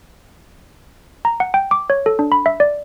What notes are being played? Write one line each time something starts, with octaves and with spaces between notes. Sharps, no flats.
A#5
F#5
G5
D6
C#5
A4
D4
B5
E5
D5